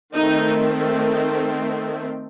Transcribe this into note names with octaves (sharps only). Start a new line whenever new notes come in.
D#3 A3 C4 D#4